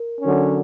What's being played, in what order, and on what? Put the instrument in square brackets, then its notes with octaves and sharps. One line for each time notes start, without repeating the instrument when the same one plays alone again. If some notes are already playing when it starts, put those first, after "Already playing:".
Already playing: [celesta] A#4
[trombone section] D3 F#3 C#4